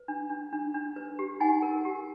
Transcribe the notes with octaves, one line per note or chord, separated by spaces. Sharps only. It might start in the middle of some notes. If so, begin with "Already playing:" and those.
Already playing: B4
D4
D4
D4
D4
B4
G4
D#4 F#5 G#5
A#4
G4